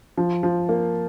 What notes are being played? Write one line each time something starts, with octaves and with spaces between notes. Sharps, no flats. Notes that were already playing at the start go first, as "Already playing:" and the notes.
F3
F3
A#3